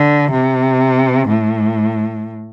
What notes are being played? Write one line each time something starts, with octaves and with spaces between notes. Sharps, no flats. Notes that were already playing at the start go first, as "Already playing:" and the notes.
Already playing: D3
C3
A2